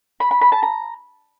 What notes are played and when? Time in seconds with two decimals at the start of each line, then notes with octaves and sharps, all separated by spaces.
0.20 B5
0.31 B5
0.41 B5
0.52 A5
0.63 A#5